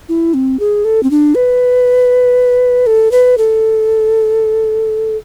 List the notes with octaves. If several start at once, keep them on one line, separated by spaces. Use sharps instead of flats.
E4
C4
G#4
A4
C4
D4
B4
A4
B4
A4